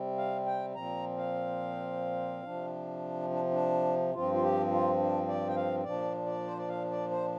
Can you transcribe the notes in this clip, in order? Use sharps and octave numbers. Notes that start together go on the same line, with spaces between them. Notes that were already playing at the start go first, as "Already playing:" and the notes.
Already playing: C3 G3 C4
F5
G5
A#2 F3 C4 A#5
F5
C3 F3 D4
D4
D4
G2 F3 C4 F4
F4
G4
F4
D4
D5
G5
F5
A#2 F3 D4 D5
D5
C5
D5
F5
D5
C5